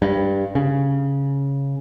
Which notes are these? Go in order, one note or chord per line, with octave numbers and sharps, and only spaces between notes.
G2
C#3